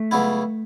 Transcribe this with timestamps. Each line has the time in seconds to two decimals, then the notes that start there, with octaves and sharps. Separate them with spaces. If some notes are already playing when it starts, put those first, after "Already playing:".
Already playing: A3
0.11 C#2 C#3 F#3 B3 E4